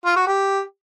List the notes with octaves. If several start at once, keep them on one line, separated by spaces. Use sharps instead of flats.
F4
F#4
G4